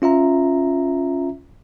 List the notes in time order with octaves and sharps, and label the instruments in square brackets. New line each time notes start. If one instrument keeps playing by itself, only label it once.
[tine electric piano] C#4 F4 E5 A#5